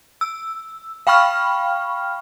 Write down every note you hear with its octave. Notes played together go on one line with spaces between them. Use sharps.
E6
F5 G5 B5 C#6 F6